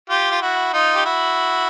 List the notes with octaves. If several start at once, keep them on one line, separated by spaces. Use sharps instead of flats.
F4 G4
F4
E4 F#4
D#4 F4
G4
E4 F#4